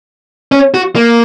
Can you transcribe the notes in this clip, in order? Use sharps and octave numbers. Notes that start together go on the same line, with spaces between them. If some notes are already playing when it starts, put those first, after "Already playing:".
C#4
F#4
A#3